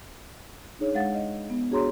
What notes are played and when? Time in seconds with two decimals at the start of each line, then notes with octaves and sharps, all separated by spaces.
0.79 D4 D#4 G#4 C#5
0.95 G#3 F5 F#5 A6
1.14 D#5
1.50 B3
1.71 D4 F#4 G#4 C#5 A#5 C6